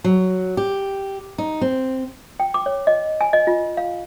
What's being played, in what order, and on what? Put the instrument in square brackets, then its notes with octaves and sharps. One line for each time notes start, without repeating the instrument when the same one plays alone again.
[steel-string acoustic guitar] F#3
G4
D#4
C4
[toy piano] G5
D6
C#5
D#5
G#5
D#5
F4
F5